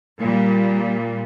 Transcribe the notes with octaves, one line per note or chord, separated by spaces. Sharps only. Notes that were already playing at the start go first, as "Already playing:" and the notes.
A#2 G3